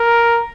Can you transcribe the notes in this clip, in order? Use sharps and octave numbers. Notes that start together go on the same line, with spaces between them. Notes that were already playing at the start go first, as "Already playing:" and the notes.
Already playing: A#4